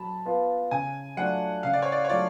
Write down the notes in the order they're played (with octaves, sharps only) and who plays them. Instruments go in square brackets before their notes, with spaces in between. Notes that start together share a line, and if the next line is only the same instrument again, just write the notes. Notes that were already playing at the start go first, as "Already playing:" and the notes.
Already playing: [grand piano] F#3 [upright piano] A5 B5
[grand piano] B3 F4
[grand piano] C#3 [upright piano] G#5
[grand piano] F#3 A3 D4 F4 [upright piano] F#5
[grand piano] C#3 [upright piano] F5
[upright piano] D5
C#5
D5
C#5
[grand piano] F#3 A3 D4 F4 [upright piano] D5